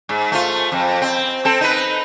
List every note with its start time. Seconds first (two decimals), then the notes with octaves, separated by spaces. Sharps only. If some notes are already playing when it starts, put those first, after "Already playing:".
0.09 G#2
0.32 A3 F4
0.72 F2
1.02 C4
1.45 C4 A4
1.61 D#4 B4